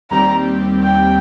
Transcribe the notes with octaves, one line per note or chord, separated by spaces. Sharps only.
D#2 D#3 G3 C4 G4 A#5
G5